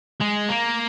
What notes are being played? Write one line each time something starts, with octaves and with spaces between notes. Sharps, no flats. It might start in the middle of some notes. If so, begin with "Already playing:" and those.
G#3
A#3